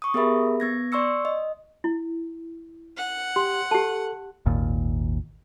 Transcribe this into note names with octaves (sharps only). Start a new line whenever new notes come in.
C#6 D#6
B3 G4 G#4 A#4 E5 B5
B3 G#6 A#6
D5 C6 C#6 E6 C#7
D#5
E4
F#5
G4 C6
G4 A4 A5
G#1 D#2 A#2